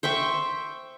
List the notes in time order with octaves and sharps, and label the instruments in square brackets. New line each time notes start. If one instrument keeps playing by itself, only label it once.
[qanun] C5 E5 G5 C#6